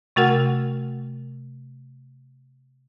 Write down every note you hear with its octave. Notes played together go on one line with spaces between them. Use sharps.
C3 A3 F#4 A#4 F#5 F6